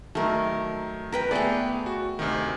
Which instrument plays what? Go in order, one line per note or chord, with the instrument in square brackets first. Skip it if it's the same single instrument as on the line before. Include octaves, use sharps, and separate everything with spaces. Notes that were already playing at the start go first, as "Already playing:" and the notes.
[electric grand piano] D#3 F#3 [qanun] A3 A#4
[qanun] A#4 B4 G5
[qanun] A3 G5 [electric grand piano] B3 G#4 D5
[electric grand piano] F#4
D2 C3 D#3